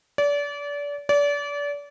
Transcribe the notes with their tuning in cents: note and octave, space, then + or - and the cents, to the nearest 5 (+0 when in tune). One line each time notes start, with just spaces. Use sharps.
D5 -30
D5 -30